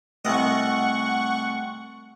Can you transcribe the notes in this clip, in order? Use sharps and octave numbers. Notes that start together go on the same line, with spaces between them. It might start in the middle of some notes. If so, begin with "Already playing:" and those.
C2 A3 D#5 F#5 C#6